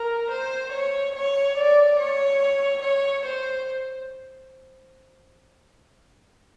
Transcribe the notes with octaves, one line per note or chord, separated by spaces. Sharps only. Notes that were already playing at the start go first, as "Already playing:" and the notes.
Already playing: A#4
C5
C#5
C#5
D5
C#5
C#5
C5